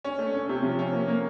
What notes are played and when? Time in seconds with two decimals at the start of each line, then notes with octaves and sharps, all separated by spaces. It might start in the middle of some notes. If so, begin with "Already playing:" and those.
0.04 C#4
0.19 A3
0.34 C#4
0.49 C3
0.63 F3
0.79 C#4
0.93 A#3
1.08 A#3